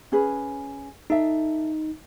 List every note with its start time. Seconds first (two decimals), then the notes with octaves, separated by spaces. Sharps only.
0.12 C#4 G#4 B4
1.10 D#4 A4 E5